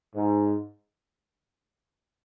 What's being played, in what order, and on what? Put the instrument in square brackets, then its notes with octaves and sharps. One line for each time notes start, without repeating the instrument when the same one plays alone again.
[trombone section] G#2